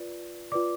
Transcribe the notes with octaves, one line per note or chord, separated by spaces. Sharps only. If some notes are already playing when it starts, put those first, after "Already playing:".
Already playing: F4 B4 D5
F4 B4 D5 D6